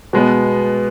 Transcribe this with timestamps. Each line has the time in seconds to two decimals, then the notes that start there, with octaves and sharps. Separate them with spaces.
0.13 B2 G#3 B3